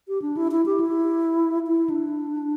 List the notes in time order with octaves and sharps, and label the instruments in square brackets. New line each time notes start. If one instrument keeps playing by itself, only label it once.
[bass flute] G4
D4
E4
E4
G4
E4
E4
D4